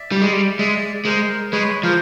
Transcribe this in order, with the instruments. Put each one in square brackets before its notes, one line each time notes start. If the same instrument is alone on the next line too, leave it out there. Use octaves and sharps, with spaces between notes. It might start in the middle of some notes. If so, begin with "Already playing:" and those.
Already playing: [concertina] D5 E5
[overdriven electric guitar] G3
G#3
G3
[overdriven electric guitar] G#3 [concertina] D5 E5
[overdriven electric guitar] G#3 [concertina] A#4 C5
[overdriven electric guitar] G#3 [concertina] B4 C#5
[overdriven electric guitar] F3 [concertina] A#4 C5